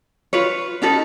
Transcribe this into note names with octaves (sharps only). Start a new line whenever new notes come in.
F4 B4 C#5
C#4 D#4 A4 B4